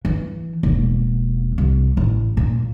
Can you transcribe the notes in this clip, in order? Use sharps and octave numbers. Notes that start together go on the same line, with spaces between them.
E3
E1 A#3
C2
A1
A#2